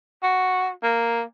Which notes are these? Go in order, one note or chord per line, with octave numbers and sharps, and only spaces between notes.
F#4
A#3